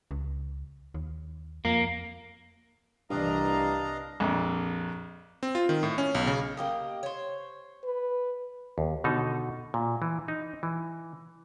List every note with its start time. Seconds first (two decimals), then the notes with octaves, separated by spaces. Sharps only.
0.11 C#2
0.94 D#2
1.65 F2 A#3
3.10 C2 G2 E3 D4 D#5 F5 A#5
4.20 A#1 F2
5.43 C4
5.55 F4
5.69 D#3
5.83 A2
5.98 C#4
6.15 B1
6.27 C#3
6.57 A#3 G4 D#5
7.03 C5 C#5
7.85 B4
8.78 D#2
9.04 B2 D3 D#4 A4
9.74 A#2
10.02 E3
10.28 D#4
10.63 E3